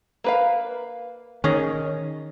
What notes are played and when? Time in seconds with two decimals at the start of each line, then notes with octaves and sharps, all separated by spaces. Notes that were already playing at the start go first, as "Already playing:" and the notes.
0.24 A#3 B4 F5
1.44 D#3 C#4 G#4 D#5